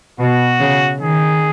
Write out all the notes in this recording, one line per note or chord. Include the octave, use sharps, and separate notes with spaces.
B2 F#4
C#3
D#3 G#4